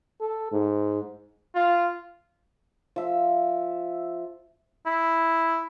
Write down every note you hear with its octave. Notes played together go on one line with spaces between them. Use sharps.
A4
G#2
F4
F3 E5
E4